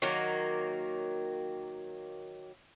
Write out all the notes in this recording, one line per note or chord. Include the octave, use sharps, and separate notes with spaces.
D#3 F#3 A#3